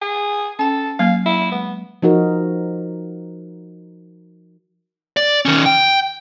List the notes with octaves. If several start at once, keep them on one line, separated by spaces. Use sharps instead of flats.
G#4
C#4 A4 G5
F#3 A#3 F5
E4
G#3 B3
F3 D#4 F#4 A#4
D5
D#3 C#4
G5